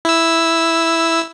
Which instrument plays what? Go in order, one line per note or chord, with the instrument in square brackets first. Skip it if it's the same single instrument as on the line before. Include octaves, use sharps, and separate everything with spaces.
[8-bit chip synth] E4 E6